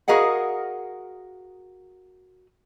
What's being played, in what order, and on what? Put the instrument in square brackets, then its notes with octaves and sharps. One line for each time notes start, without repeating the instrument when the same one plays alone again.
[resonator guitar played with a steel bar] F#4 G#4 A#4 D#5 F5 F#5